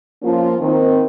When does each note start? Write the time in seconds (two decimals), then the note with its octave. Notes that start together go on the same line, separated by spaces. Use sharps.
0.23 F3 A#3 C#4 F4
0.61 D#3 C4